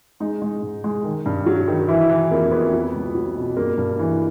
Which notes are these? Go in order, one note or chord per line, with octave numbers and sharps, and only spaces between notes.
G#3 D#4
G#3
G#2
G#3
D#3
G2
F#3
D#3
E3 E4
E3
F2 A#3
F2 B3
F#3
C#2
F#3
B2
G2 A#3
G2
E3